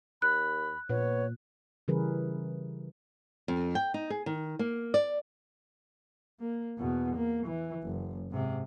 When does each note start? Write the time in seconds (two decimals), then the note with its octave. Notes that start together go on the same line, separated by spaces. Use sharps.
0.22 D#2 B5 F#6
0.90 A#2 B3 C#5
1.88 C#3 E3 G3 G#4 A#4 B4
3.48 F2
3.75 G5
3.94 D#4
4.10 G#4
4.26 D#3
4.59 A#3
4.94 D5
6.40 A#3
6.78 E2 B2
7.16 A#3
7.46 E3
7.83 F#1
8.31 G#2 C3